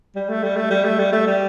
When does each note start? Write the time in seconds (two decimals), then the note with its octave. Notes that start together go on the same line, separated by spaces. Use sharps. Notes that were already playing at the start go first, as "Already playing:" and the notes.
0.16 G3
0.29 A3
0.43 G3
0.56 A3
0.70 G3
0.84 A3
0.99 G3
1.12 A3
1.27 G3